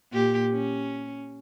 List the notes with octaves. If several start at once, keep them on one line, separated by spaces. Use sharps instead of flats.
A#2 G4
C#4